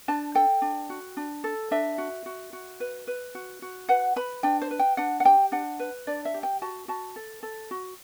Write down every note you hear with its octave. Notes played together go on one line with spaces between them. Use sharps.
D4 A5
A4 G5
D4
F#4
D4
A4
D4 E5
F#4
F#4
F#4
B4
B4
F#4
F#4
B4 F#5
B4 B5
D4 G5
C5
B4
G5
D4 F#5
F#5
G4 G5
D4 F#5
B4
D4 D5
E5
G4
G5
F#4 A5
F#4 A5
A4
A4
F#4